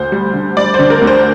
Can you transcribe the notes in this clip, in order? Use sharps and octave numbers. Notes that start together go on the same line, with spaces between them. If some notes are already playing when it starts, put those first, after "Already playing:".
Already playing: D2 C5
G3
D3
G3 D5
D3 C5
A#4
D2
C5